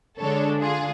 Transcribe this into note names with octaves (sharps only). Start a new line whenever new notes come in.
D3 G#3 D4 A4 C#5
F4 G#4